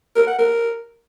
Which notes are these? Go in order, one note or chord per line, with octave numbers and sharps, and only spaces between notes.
A#4
F#5
A#4